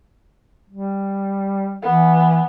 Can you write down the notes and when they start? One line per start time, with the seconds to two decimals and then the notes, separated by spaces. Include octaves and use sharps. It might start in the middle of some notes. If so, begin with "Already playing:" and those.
0.69 G3
1.83 E3 B3